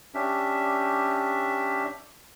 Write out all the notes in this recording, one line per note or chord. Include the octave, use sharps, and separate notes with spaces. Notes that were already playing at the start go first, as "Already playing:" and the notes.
C#4 D4 G4 E5